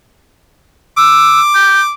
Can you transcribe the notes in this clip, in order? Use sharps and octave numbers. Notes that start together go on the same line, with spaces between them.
D6 E6
G6